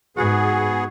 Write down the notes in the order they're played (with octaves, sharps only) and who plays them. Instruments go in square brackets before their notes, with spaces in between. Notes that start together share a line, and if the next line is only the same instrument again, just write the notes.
[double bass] G#2 [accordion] B3 G#4 [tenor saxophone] F#4